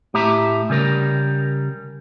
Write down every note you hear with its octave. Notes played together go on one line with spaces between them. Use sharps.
A2 G4 E5 A#5
C#3 G3 A#4